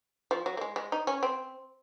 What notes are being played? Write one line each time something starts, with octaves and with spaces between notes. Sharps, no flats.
F3
F#3
A#3
G#3
G#3
D#4
C#4
C4